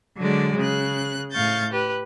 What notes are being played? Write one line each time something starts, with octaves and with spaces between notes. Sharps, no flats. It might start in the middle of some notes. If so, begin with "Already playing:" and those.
D3 F#3 G#3 D5
C#3 F#6
A2 F5 C#6 G6 A6
G4 B4